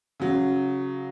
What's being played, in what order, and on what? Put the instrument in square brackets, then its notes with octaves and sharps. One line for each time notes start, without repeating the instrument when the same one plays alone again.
[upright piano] C#3 F#3